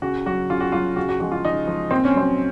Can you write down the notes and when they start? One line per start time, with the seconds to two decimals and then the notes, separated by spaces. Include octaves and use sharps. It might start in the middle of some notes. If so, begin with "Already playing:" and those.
0.02 C#3 F#4
0.26 F#3 F#4
0.50 C#3 F4
0.60 F#4
0.72 F#3 F4
0.96 C#3 F#4
1.09 F#4
1.20 F3 G#3 F#4
1.32 F4
1.44 C#3 D#4
1.67 F3 G#3
1.91 A#2 C4
2.05 C#4
2.14 F#3 C4